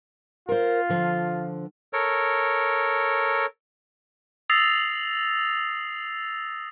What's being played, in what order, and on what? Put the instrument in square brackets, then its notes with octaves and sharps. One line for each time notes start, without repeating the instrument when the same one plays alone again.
[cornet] F4 [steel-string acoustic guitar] A#4 C5
[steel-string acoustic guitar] D3 F3
[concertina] A4 A#4 C#5
[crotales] D#6 E6 A6 A#6 C7 F7